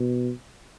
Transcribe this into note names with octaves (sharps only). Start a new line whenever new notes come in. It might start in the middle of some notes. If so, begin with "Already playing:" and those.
Already playing: B2